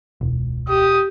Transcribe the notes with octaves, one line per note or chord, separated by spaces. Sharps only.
E1 C#2
G4 D#6